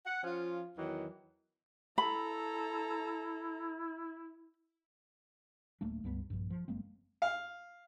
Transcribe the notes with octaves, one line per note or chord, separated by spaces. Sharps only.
F#5
F3 C#4 F4
E2 D#3 E3 F#3
E4 A4 A#5 B5
D1 A3 A#3 D4
C#2 G2 B3
A#1 G2
F3
F#1 G#3 A#3 C4
F5